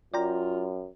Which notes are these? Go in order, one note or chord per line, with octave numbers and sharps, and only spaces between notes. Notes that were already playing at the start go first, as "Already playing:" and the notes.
F#2 F4 D5 G5 A#5